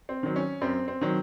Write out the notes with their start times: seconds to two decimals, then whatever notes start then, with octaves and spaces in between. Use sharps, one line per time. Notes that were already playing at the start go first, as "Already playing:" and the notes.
0.09 C4
0.23 D#3 F#3
0.36 C#4
0.61 F#2 C4
0.88 C4
1.01 D#3 F#3